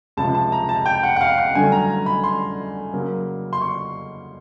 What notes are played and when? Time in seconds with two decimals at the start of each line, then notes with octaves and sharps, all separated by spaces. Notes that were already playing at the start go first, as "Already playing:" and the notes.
0.17 C#2 C3 F3 A5
0.35 A5
0.52 A#5
0.69 A5
0.86 G5
1.03 F#5
1.16 F#5
1.21 F5
1.38 F#5
1.55 G2 D3 F#3 A3 G#5
1.72 A#5
1.90 A#5
2.06 B5
2.24 C6
2.94 C#3 F#3 A#3
3.53 C6
3.61 C#6